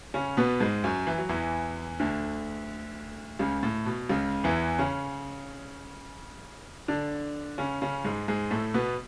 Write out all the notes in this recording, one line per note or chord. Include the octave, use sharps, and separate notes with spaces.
C#3 C#4
B2 B3
G#2 G#3
F#2 F#3
E3
F#3
E2 E3
D2 D3
C#2 C#3
A2
B2
C#2 C#3
E2 E3
C#3 C#4
D3 D4
C#3 C#4
C#3 C#4
G#2 G#3
G#2 G#3
A2 A3
B2 B3